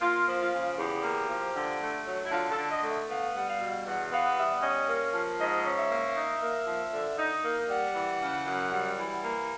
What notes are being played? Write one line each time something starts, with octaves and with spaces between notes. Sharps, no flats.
A#3 F4
F3
F4
C#3
E2 G4
A#3
F3
D3
A3
F#3
E4
D3 F4
A4
D3
D#5
A3
E5
B3 F5
G3 F#5
F5
B2
E2 F#5
B3 F5
G3 E5
C#4 D#5
A#3
F3
G#2 D#5
C#4
E5
A#3
D#4
A#3
F3
D3
D#4
A#3
G3 F#5
E3
C#3
F#2
G3
E3
A#3